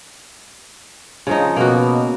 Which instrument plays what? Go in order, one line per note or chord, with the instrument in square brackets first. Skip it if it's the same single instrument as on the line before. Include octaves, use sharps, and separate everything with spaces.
[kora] C#3 F3 D#4
[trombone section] B2 [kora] A#3 F#4